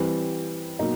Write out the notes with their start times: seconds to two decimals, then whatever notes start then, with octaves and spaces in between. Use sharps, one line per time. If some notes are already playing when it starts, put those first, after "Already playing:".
Already playing: E3 G3 C4
0.79 B2 F#3 A#3 D#4